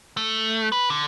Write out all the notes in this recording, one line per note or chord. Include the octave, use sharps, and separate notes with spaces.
A3
B4
D3